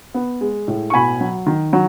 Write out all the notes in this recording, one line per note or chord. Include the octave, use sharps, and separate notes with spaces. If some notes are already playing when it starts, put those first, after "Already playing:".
B3
G#3
A2
C#6
B2 G#5 B5
F#3
D#3
F#3